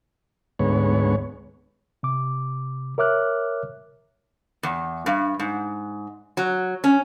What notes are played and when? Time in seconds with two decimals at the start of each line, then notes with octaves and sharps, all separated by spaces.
0.59 D2 G#2 B3 C#5
2.03 C3 D6
2.98 A#4 C#5 E5 D6 F6 F#6
4.63 E2
5.06 G2
5.39 G#2
6.37 F#3
6.84 C#4